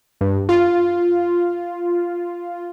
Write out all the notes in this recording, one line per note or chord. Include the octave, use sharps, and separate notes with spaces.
G2
F4